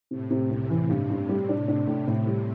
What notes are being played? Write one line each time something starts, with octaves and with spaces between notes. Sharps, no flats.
A2 C3
C3
C2 C3
E3
G2
G2
G3
D4
D4
A2
A2
G3